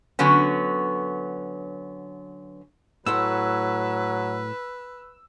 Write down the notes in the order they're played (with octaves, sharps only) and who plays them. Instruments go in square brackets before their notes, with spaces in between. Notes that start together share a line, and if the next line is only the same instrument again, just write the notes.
[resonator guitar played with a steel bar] D3 F#3 B3 C#4
[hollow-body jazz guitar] A2 F#5 C6 [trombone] F#3 [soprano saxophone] B4 [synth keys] E6